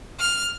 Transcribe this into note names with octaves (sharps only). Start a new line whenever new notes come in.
F6